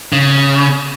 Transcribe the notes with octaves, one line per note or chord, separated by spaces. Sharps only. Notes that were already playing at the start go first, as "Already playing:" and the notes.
C#3